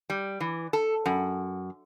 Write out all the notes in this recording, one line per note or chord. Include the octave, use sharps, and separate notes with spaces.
G3
E3
A4
F#2